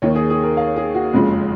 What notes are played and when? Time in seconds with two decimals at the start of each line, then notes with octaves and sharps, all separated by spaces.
0.02 D#2 D#3 A#3 C#5
0.15 G#4
0.30 G#4
0.44 A#4
0.57 F5
0.76 G#4
0.95 F#4
1.13 F#1 F2 C#3 F3 G#3